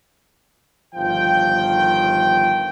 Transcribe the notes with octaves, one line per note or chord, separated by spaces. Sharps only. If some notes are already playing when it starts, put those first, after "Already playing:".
G1 D#3 F3 G5